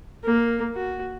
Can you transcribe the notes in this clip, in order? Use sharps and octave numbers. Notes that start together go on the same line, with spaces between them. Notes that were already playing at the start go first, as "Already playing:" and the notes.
A#3
F#4